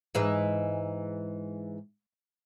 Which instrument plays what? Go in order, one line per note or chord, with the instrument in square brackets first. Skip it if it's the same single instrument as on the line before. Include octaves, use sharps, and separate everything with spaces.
[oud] G#2 E3 G#3